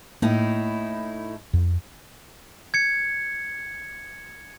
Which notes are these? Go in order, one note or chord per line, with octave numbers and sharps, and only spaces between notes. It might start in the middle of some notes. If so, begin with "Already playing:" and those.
A2 A#3 D#4 E4
F2
G#6 C#7